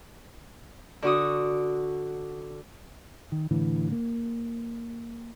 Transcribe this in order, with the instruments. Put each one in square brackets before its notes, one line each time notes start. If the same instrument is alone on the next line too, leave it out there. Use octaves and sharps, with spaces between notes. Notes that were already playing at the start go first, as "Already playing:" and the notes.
[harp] D3 F#4 D#6
[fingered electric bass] D#3
A2 D3 E3
A#3